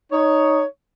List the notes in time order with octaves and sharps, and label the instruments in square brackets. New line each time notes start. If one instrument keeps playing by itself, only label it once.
[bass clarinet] D#4 [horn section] C#5